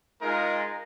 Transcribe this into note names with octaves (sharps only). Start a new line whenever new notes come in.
G#3 D#4 F4 A#4